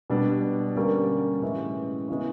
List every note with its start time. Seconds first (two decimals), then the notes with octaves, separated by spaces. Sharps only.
0.10 B2 G3 B3 D4
0.76 D3 G3 A#3 C#4
1.42 A2 E3 G#3 C#4
2.08 C#3 E3 G#3 B3 C#4